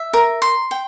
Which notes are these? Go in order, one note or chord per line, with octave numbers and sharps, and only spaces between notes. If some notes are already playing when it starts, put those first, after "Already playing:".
Already playing: E5
A#4
C6
G5